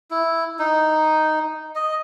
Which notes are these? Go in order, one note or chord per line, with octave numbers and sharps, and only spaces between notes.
E4
D#4
D#5